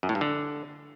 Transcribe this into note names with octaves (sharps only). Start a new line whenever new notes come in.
F#2
A2
G2
D3